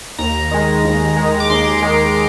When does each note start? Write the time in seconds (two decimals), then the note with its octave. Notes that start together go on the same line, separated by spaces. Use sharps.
0.18 D#2 A#5
0.51 D#3 G#3
0.85 D#2
1.17 D#3 G#3
1.40 D6
1.50 D#2 C6
1.82 D#3 G#3